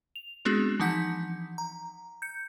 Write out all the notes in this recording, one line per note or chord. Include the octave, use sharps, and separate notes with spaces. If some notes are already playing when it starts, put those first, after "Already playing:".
F7
G#3 B3 C4 D4 F#4 G#4
E3 F3 D#4 F#5 G6 B6
A#5
G6 C#7